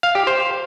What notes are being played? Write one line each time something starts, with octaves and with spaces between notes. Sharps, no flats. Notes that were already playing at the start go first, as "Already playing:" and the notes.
F5
G4
C5